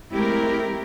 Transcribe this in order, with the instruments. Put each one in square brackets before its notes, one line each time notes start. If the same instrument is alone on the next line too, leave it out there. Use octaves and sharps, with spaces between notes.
[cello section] G#3 A3 C4 E4 G4 A#4